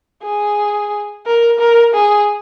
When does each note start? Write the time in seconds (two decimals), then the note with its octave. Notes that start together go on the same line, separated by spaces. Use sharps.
0.23 G#4
1.26 A#4
1.59 A#4
1.94 G#4